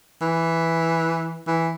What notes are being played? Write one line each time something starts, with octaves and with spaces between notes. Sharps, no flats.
E3
E3